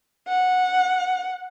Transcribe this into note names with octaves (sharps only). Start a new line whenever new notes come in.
F#5